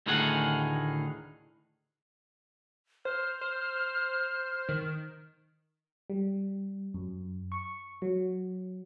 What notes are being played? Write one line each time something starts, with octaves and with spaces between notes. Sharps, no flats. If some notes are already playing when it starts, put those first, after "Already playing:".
D2 A2 D#3 D#4 G#4 F#5
C5 F6
C5
D#3
G3
F#2
C#6
F#3